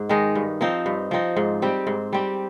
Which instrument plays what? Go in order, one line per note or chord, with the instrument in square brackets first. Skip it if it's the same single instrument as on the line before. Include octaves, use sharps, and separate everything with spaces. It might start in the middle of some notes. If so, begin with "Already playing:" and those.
Already playing: [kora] G#2
D#3 G#3 D#4
G2
F3 C4 D#4
G2
F3 C4 D#4
G#2
G3 C4 G4
G#2
G3 C4 G4